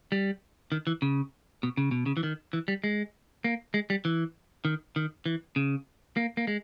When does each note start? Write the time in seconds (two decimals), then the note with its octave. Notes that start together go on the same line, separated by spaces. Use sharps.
0.12 G3
0.72 D#3
0.87 E3
1.02 C#3
1.63 B2
1.77 C#3
1.91 B2
2.06 C#3
2.17 E3
2.23 D#3
2.53 E3
2.68 G3
2.84 G#3
3.44 A#3
3.74 G#3
3.90 G3
4.05 E3
4.65 D#3
4.96 D#3
5.26 E3
5.56 C#3
6.17 A#3
6.37 A#3
6.47 G#3